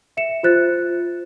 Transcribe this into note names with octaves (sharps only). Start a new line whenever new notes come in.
E5 C#7 E7
F4 C5 F#6 A6